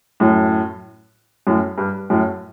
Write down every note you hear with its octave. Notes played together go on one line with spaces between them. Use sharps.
F#2 A2
F#2 A2
G2
F#2 A2